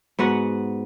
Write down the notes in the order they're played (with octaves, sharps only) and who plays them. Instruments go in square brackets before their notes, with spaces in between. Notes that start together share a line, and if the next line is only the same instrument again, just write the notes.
[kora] G#2 B3 F#4 F#5